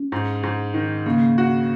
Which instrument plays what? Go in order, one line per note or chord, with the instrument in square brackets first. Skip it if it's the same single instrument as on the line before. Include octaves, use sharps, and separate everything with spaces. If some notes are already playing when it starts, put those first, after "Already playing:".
Already playing: [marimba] C#4
[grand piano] G#2
G#2
D#3
[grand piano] C#3 [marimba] A#3
[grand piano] F#4